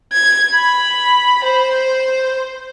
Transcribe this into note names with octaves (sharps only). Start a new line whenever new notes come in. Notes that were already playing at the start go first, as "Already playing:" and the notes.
G#6
B5
C5